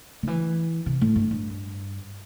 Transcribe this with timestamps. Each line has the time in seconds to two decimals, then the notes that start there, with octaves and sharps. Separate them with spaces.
0.23 D3
0.27 E3
0.86 C3
1.01 A2
1.16 G2
1.31 G2